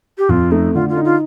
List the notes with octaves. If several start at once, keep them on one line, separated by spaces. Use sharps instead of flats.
G4
F2 F4
A3 D#4
D3 F4
F4
D#4
F4